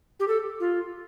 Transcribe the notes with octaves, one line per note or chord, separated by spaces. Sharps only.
G4
A4
F4